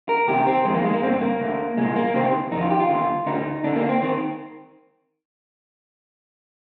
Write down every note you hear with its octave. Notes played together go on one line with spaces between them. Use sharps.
A#4
D2 C3 D#3 G4
C4
F2 D#3 G#3
A#3
G#3
A#3
G2 D3 C4
A#3
D2 D3
C2 A#2 G#3
A#3
D2 C3 D#3 C4
F2 D#3 D#4
F4
G4
F4
D#2 D3
D2 D3 D#4
D2 D3 D4
A#3
C4
D#3 C4